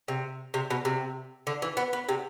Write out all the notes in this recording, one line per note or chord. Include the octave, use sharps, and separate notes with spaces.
C3
C3
B2
C3
D3
E3
B3
B3
C3